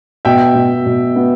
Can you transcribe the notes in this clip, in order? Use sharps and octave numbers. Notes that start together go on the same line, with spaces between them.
B2 E5 G5
B2
B2
B3